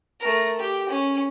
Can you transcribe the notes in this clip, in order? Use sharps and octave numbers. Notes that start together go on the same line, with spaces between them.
A3 A#4
G4
C#4